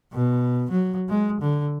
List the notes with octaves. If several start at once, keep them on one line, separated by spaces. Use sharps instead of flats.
B2
F#3
G#3
D3